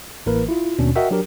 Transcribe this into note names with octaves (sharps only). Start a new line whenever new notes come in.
A1 E3 A#3 A#4 B4
E4 F4
D#2 B2 C#4 D4
F#4 A#4 D#5 E5 F#5 G5
F#3 D4 G4 A#4